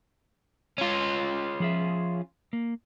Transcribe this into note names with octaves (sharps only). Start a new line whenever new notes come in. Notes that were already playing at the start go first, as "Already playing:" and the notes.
C#4 F4
F3 G#4 E5
A#3